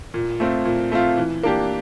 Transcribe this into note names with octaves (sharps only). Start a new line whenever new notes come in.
A#2
A3 C4 F4
A#2
A3 C4 F4
E3
A#3 D4 G4